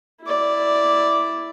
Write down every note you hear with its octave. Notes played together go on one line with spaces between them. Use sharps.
E4 D5